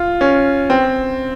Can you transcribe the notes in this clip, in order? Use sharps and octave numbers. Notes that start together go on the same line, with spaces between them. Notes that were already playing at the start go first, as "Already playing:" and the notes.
Already playing: F4
C#4
C4